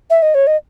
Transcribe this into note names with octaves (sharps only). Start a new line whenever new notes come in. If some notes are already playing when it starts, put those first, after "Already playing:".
E5
D#5
C#5
D#5